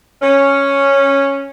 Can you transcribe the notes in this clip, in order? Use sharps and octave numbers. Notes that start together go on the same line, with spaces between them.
C#4